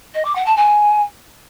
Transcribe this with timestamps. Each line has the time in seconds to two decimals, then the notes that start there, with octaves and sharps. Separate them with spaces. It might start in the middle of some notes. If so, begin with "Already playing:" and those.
0.14 D#5
0.24 D6
0.35 F#5
0.45 A5
0.56 G#5